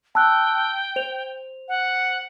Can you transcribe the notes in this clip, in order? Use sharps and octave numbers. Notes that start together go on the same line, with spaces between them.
G5 A5 E6 F#6
C5 F7
F#5